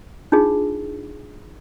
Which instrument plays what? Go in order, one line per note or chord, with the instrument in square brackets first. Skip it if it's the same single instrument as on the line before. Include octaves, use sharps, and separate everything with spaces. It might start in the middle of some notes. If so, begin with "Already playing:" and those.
[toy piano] D4 D#4 F4 G#4